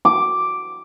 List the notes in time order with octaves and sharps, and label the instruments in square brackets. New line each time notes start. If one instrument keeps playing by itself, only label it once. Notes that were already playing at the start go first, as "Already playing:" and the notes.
[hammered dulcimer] D6